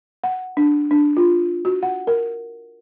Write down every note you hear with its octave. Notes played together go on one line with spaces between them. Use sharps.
F#5
D4
D4
F4
F#4
F#5
A#4